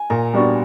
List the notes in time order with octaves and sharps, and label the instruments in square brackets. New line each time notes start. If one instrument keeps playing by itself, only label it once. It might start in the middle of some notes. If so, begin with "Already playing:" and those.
Already playing: [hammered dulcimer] G#5
[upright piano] A#2 [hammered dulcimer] A#5
[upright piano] G3 B3 D4 F#4